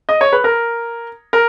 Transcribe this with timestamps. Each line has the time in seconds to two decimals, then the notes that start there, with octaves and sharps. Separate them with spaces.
0.09 D#5
0.21 C#5
0.32 B4
0.44 A#4
1.33 A#4